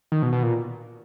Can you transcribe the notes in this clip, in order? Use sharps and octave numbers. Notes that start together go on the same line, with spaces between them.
D#3
B2
B2
A#2